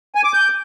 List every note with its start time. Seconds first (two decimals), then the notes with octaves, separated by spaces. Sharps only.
0.15 G#5
0.24 D6
0.33 G6